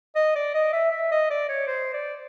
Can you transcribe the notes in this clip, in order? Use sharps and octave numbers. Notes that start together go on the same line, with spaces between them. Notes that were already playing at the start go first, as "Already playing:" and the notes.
D#5
D5
D#5
E5
E5
D#5
D5
C#5
C5
D5